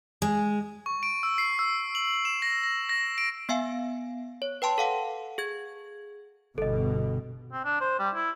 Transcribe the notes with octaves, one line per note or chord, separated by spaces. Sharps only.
G#3
C#6
D7
E6
C7
E6
F#7
E7
A#6
A#6
A#6
D7
B3 E5 F5 G#5
C#5
B4 G5 A5 C6
A4 F5 F#5
G#4 G#6
G1 B2 A4 D#5
C4
D4
C5
G3
E4